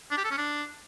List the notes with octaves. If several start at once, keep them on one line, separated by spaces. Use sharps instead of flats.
D4
G4
A4
C#4
D4